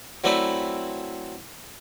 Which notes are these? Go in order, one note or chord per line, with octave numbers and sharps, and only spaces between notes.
F#3 A3 C4 E4 B4 D5